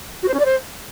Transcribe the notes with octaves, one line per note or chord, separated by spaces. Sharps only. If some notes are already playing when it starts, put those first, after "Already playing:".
F#4
C5
C#4
D5
C5